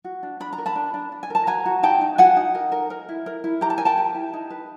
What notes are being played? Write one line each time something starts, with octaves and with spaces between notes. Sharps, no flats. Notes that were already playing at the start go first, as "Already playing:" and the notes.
F#4
D4
D4 B5
A#5
A#4
A5 B5
D4
D4
D4
G#5
A#4 A5
F#4 G#5 A#5
F#4
D#4 G5 A5
D#4
F#4 F#5 G#5
D#4
A#4
A#4
A#4
E4
A#4
E4
G4 A#5
A5
A#4 G#5
G5 A5
G4
E4
D#4
B4